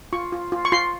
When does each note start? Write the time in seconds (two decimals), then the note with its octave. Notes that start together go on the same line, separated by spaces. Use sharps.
0.13 F4 C#6
0.32 F4
0.52 F4
0.65 C#6
0.72 F4 C6